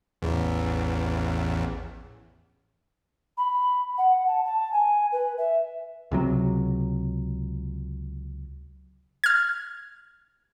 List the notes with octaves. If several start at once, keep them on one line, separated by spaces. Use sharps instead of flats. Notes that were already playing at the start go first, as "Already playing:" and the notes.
A1 E2
B5
F#5
A5
A5
G#5
B4
E5
C#2 C3 F#3
F6 G#6